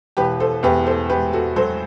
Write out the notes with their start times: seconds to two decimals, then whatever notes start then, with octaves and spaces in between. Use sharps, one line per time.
0.17 E1 G4 B4
0.40 A4 C5
0.63 E2 G4 B4
0.87 A4 C5
1.10 E2 G4 B4
1.33 F#4 A4
1.56 F#3 A4 C5